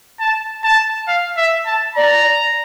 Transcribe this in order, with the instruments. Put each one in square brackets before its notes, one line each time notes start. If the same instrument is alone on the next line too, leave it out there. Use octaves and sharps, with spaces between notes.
[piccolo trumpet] A5
A5
F5
E5
A5
[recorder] D5 [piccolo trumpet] A#5